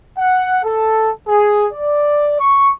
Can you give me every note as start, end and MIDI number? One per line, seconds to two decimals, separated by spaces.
0.18 0.58 78
0.63 1.11 69
1.28 1.67 68
1.73 2.37 74
2.40 2.70 85